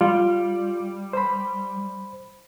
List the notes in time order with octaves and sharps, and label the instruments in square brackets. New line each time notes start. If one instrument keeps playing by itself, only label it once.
[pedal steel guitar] G3 [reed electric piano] F4
[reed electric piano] C5 B5